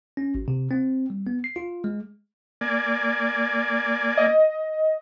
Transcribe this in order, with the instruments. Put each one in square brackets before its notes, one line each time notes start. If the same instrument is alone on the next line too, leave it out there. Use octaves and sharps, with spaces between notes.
[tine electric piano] C#4
G#1
C3
C4
G3
B3
C7
F4
G#3
[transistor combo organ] A#3 D5 G#5
[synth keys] D#5